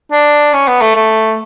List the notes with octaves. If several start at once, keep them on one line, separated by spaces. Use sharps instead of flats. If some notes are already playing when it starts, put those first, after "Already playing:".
D4
C#4
B3
A3
A3